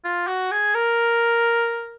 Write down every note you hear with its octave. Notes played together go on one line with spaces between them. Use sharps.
F4
F#4
G#4
A#4